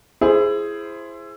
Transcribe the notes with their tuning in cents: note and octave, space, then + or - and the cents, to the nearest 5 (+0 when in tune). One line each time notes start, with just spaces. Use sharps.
E4 +25 G#4 +5 C5 +0